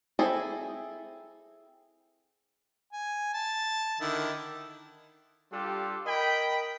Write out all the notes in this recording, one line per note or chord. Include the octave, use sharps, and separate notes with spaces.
C4 E4 G#4 A4
G#5
A5
D3 D#3 E4
G3 D4 F4 G4 A4
A#4 D#5 G5 B5